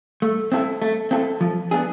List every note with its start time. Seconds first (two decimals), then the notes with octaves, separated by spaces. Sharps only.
0.22 A3
0.52 C4 E4 A4
0.82 A3
1.11 C4 E4 A4
1.41 F3
1.71 B3 D4 G#4